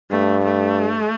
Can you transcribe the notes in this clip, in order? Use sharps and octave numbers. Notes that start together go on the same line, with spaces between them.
G2 A3
A3